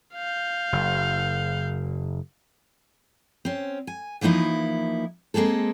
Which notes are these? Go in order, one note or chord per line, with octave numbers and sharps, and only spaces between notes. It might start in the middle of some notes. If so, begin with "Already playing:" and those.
F5 G6
F#1
C4 C#4
G#5
E3 F3 A#3 D#4 E4
G#3 A#3 C4 G#4 A4